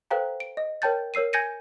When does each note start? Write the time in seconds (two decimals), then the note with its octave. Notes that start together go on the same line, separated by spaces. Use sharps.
0.11 A4 B4 C5 F5 G5 A#5
0.40 D7
0.57 D#5
0.82 A#4 C#5 G5 A5 G6 A6
1.14 A#4 C#5 E6 C7 D#7
1.33 G#5 G6 G#6 A#6 C#7 D#7